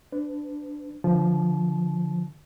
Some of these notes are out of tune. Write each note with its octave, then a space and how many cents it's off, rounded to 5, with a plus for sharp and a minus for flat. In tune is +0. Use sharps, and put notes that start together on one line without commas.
D4 +0 B4 +40
D3 +0 F3 +0 A5 -30